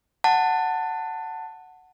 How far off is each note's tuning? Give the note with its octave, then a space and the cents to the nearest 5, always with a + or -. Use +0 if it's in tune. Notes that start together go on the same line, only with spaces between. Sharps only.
F#5 +0 A5 +15